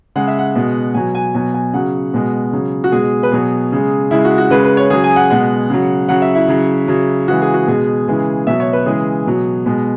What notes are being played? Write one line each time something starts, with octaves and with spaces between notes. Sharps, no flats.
C#3 G#3 F#5
E5
F#5
B2 G#3
B2 F#3 G#5
G#5
B2 F#3 G#5
G#5
C#3 F#3 F#5
B2 G#3
C#3 F#3
F#4
B2 G#3 G#4
B4
B2 F#3 G#4
C#3 G#3
C#3 G#3 E4
F#4
F#4
C#3 G#3 B4
B4
C#5
C#3 F#3 G#4
G#5
F#5
B2 G#3 F#5
C#3 F#3
C#3 F#3 F#5
E5
E4
C#3 F#3
C#3 F#3
C#3 E3 G#3 F#4
G#4
F#4
B2 G#3 G#4
C#3 E3 G#3
B2 F#3 E5
C#5
B4
C#3 E3 G#3 G#4
B2 F#3
B2 G#3